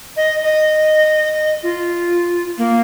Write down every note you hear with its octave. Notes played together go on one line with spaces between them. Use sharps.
D#5
D#5
F4
A#3